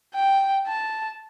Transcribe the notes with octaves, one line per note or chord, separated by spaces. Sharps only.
G5
A5